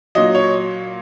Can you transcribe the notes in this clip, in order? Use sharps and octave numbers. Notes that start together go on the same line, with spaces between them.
A#2 F#3 D#5
C#5